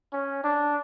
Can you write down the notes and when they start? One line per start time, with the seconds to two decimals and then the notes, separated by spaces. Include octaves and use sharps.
0.13 C#4
0.44 D4